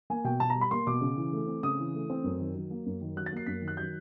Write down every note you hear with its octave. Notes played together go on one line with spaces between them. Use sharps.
A#3 G#5
B2 G5
B2 A5
A#5
G3
B5
A#3 C6
B2 D6
C#3
E3
A3
C4
C#3 D#6
E3
A3
C4
F#2
D#3
F#3
A#3
F#2
D#3
F#3 F#6
A6
A#3 C7
F#2 B6
D#3
F#6
F#3 G6